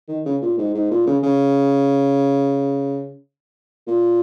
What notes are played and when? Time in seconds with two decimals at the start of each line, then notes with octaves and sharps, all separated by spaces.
0.08 D#3
0.26 C#3
0.42 A#2
0.58 G#2
0.75 G#2
0.91 A#2
1.07 C#3
1.23 C#3
3.87 A#2